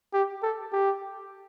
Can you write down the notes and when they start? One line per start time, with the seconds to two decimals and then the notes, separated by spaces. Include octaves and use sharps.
0.14 G4
0.43 A4
0.72 G4